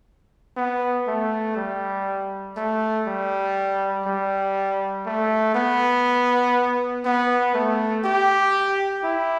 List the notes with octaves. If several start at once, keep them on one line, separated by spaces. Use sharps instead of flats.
B3
A3
G3
A3
G3
G3
A3
B3
B3
A3
G4
E4